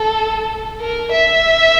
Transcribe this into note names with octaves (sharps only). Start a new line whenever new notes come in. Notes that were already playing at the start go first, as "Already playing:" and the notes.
Already playing: A4
A#4
E5